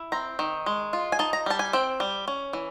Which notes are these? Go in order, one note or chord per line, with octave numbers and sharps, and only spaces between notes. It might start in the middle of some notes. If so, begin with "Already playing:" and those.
Already playing: E4
C4 A#5
D#3
G#3
F4
G#5
D#4 A5
A#5
G3 A5
G#5
C4 G5
G3
C#4
E3